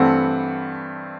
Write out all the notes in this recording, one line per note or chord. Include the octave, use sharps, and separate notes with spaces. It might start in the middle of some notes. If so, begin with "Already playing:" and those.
Already playing: G2 E3 A3 C4 F#5